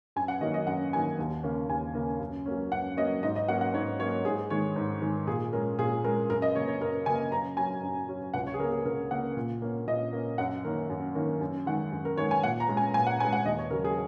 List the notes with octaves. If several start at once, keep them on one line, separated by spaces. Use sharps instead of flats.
F#2 G#5
F#5
D#3 F#3 A#3 C#4 D#5
D#5
F#2 F#5
D#3 F#3 A#3 C#4 G#5
D#2
C#3 A#3 C#4
D#2 G#5
C#3 A#3 C#4
F#2
F#3 A#3 C#4
F#2 F#5
F#3 A#3 C#4 D#5
G#2 D#5
D#5
F#3 A#3 C#4 F#5
F#5
G#2 C#5
F#3 A#3 C#4 C#5
G#2 G#4
D#3 G#3 C#5
G#2
D#3 G#3
A#2 G#4
G#3 C#4 A#4
A#2 G#4
G#3 C#4 A#4
F#2 A#4
D#5
C#3 A#3 C#5
C#5
F#2 A#4
C#3 A#3 G#5
F#2 A#5
F#3 C#4 G#5
F#2
F#3 C#4
C#2 F#5
C#5
G#4
C#3 A#3 A#4
G#4
C#2 A#4
C#3 A#3 F#5
A#2
A#3 C#4
A#2 D#5
A#3 C#4
F#2 F#5
D#3 A#3 C#4 A#4
F#2
D#3 A#3 C#4
F#2
D#3 G#3 F#5
F#2
A#4
D#3 G#3 C#5
G#5
A#2 F#5
A#5
G#3 C#4
G#5
A#2 G#5
F#5
G#3 C#4 G#5
F#5
D#2 D#5
C#5
C#3 F#3 A#4
G#4